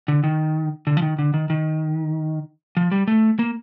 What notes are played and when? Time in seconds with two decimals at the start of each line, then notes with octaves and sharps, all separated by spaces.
0.08 D3
0.24 D#3
0.87 D3
0.97 F3
1.02 D#3
1.19 D3
1.34 D#3
1.50 D#3
2.77 F3
2.91 G3
3.08 A3
3.39 A#3